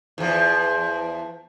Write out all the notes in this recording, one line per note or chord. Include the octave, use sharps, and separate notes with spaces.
E2 F3